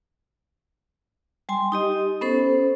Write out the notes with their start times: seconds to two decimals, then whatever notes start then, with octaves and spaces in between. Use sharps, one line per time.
1.49 G3 G#5 C6
1.72 D#4 G4 D#5
2.21 B3 C#4 A4 C5